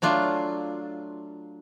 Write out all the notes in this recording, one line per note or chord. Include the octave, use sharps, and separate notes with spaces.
F#3 A3 D4 F4